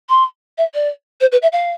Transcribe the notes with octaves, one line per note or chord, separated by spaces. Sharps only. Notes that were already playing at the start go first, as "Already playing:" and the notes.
C6
E5
D5
C5
B4
E5
F5